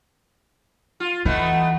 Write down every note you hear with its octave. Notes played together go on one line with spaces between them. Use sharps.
F4
E3 A3 B3 D#4